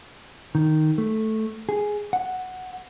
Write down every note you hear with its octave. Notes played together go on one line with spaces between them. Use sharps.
D#3
A3
G#4
F#5